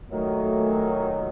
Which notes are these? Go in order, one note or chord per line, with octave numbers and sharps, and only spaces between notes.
A#2 D#3 F#3 A3